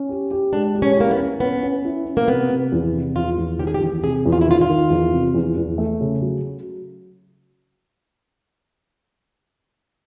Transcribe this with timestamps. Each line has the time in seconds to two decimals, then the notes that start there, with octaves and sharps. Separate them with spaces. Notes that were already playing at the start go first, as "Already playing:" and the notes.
Already playing: C#4
0.09 G4
0.31 G4
0.53 G#3 D4
0.75 G4
0.82 C#4
0.97 A#3 E4
1.11 B3
1.19 C#4
1.40 B3 C#4
1.63 C#4
1.85 E4
2.06 C#4
2.17 A#3
2.28 C3 B3
2.50 C3
2.72 E2
2.94 C3
3.16 E2 F4
3.38 E2
3.59 D#3 G4
3.67 G#4
3.74 G4
3.81 E2
4.04 C3 G#4
4.26 E2
4.32 F4
4.41 E4
4.47 D#3 F4
4.61 F4
4.69 D#3
4.90 E2
5.13 C3
5.34 E2
5.56 E2
5.78 A3
6.01 C#3
6.22 F#3